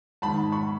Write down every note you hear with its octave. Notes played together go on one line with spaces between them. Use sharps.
G#2 D#3 A5 B5
B5 C#6